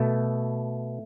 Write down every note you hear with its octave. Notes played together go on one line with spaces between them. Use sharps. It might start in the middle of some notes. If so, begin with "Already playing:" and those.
Already playing: B2 A3